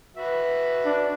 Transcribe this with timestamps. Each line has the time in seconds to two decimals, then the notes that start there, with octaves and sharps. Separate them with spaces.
0.17 F#4 B4 E5
0.85 D4